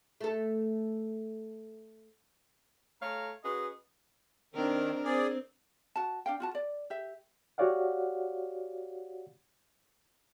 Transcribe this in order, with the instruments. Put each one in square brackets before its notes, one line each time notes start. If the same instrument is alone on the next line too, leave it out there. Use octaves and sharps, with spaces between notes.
[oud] A3 A4
[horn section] A3 A4 C#5 F5 A#5
C#4 F#4 G#4 B4 D#5
[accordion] D#3 [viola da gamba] C4 D4 A#4
[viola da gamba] C4 [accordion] G#4 D5
[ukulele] F#4 A5
D4 F5 G5
F4 F#4 A5
D5
G4 E5
[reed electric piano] F#4 G4 C#5 D5 F5 F#5